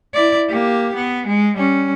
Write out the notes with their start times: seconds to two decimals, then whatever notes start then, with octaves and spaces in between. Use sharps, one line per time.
0.14 E4 D5
0.49 A#3 G4
0.94 B3
1.26 G#3
1.57 G3 C#4